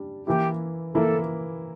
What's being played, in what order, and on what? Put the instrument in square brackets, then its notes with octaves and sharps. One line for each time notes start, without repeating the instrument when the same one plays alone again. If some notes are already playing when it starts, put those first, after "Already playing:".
Already playing: [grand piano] G3 D4
[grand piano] E3 A#3 E4 [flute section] G4
[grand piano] E3 A#3 E4 [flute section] A4